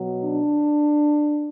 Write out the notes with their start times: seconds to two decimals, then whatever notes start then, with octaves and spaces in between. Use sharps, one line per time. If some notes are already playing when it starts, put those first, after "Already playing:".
Already playing: B2 F#3
0.25 D4